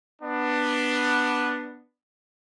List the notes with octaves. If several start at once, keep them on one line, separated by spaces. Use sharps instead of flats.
B3 D4